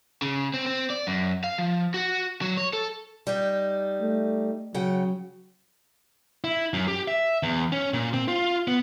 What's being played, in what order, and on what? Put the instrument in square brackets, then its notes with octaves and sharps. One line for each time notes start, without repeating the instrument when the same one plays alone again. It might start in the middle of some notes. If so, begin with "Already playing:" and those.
[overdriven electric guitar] C#3
C4
C4
D5
F#2
F5
F3
F#4
F#3
C#5
A4
[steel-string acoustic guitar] G3 D#4 G4
[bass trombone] A3
[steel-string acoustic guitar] C#3 F#5 G5 [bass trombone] F#3
[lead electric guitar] E4
F#2
G4
E5
E2
C#4
A#2
C4
F4
B3